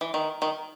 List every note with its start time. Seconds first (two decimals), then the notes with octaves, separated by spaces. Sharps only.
0.01 E3
0.14 D#3
0.42 D#3